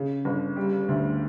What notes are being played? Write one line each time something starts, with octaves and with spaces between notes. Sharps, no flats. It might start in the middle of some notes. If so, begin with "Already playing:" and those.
Already playing: C#3
G1
G3
D2